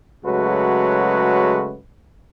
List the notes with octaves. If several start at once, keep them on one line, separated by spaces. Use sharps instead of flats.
C#3 F#3 G#3 A3 F#4 B4